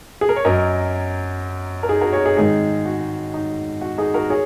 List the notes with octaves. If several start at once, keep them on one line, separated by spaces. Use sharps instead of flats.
G#4
A#4
C#5
F#2 F#3 A#4 D#5
A#4
D#4 G#4
F#4 A#4
G#4 C#5
D#4 G#4
G#2 D#3 G#3 D#4 G#4
F#4
D#4
F#4
D#4 G#4
F#4 A#4
G#4 C#5